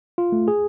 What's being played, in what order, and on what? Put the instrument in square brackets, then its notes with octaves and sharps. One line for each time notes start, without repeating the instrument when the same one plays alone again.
[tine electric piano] F4
A3
G#4